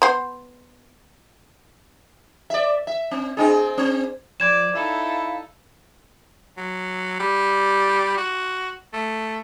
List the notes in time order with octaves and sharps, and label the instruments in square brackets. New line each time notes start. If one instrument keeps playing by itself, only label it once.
[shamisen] B3 C5
[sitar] D5 E5
E5
C4
C4 D4 G#4
C4
[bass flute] F3 [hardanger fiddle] D5 [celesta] G#6 E7
[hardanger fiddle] D#4 A4 [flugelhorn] E4 [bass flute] F5
[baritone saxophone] F#3
G3
F#4
A3